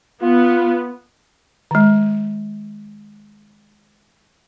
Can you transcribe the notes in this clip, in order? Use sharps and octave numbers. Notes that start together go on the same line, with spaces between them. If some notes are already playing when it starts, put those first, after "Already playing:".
B3 F4
D#3 G#3